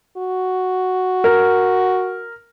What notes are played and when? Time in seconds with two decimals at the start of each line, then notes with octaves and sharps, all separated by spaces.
0.17 F#4
1.24 A#4